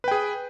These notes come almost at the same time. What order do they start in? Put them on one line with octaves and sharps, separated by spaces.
B4 G5 G#4